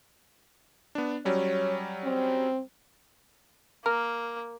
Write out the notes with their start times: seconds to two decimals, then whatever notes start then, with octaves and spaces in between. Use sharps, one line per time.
0.95 B3 D4
1.25 F#3 G3 C#4 C#5
2.04 C4
3.86 A#3 A#4 F6